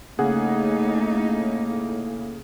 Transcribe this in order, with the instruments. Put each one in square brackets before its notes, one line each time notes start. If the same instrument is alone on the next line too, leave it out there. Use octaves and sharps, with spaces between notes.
[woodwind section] A2 A#3 [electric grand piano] C#3 G#4 F#5 [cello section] A3 D#4